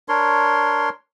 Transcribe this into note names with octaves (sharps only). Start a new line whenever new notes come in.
D4 A#4 C#5 C6